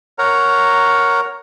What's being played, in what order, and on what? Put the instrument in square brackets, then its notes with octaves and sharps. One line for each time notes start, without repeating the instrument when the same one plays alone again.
[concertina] A#4 C#5 F#5 A#5